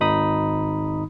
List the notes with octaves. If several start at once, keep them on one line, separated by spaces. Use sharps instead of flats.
G#1 D#4 B5 D#6